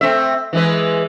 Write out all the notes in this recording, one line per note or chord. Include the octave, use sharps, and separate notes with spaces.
A3 C4 E5
E3 G#3 B4